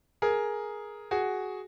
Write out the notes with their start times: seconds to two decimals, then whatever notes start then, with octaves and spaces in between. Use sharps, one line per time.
0.22 G#4 A#4
1.11 F#4 G#4